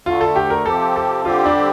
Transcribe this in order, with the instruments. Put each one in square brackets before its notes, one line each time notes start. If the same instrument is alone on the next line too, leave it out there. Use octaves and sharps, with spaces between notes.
[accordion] D2 D3 A3 [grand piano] F4
[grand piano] A4
G4
A#4
[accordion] C3 F3 C4 G4 [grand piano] A4
[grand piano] A4
[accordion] D3 G3 C4 G4 [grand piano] F4
[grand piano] D4